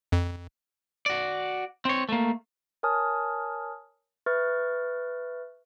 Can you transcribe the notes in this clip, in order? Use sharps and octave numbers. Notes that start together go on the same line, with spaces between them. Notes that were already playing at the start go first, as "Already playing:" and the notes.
F2
F#4 D5
C4 C#5
A3 A#3
A#4 C#5 G#5 A5 D#6 F6
B4 E5 C#6 F6 A6